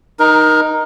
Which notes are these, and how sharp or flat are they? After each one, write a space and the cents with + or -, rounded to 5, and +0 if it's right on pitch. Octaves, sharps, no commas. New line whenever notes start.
D#4 +0 A#4 +25